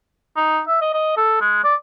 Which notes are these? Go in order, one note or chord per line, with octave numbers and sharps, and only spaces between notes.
D#4
E5
D#5
D#5
A4
G#3
D5